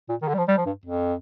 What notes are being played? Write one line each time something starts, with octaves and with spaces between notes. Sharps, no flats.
A#2
D#3
D3
G3
F3
G3
F3
G2
F2